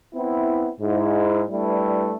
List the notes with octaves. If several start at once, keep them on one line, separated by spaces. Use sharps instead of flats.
B3 C4 E4
G#2 E4
G3 A3 D4 E4 B4